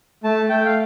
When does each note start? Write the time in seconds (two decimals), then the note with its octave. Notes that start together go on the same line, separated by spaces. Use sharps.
0.24 A3 A5
0.49 A3 G5
0.65 F5